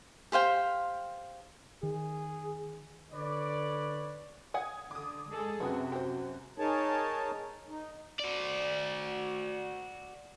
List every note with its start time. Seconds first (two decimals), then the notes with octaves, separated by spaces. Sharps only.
0.32 G4 C5 F5 G5
1.83 D#3 G#4
3.13 D3 B4 C#5 D5
4.54 F#5 G#5 D#6 G#6
4.91 D3 D6 D#6
5.28 G#3 G#4 A4
5.60 F#2 C3 B3 F#4 G#4
5.92 G4 C5
6.58 D#4 G#4 A#4 C#5 A5
7.69 D#4
8.20 F#4 D5